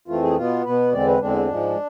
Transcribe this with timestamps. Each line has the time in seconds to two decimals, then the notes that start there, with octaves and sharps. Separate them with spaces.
0.08 F2 E3 A3 C4 F4
0.23 G#4
0.37 B2 B3 F4
0.64 B2 B3 B4
0.93 E2 D3 G#3 C4 D5
1.07 B4
1.21 E2 D3 G#3 C4 D4
1.50 G#2 F3 G#3